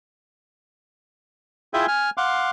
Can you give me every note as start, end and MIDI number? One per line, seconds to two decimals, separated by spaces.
1.74 1.86 64
1.74 1.86 65
1.74 1.86 68
1.74 1.86 76
1.74 1.86 79
1.74 1.86 80
1.88 2.10 80
1.88 2.10 89
2.17 2.51 77
2.17 2.51 78
2.17 2.51 84
2.17 2.51 86